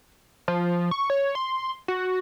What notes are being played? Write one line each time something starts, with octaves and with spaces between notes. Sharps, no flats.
F3
C#6
C#5
C6
F#4